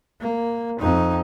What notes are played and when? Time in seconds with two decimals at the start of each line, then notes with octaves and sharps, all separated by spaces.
0.21 A#3
0.80 F2 D#4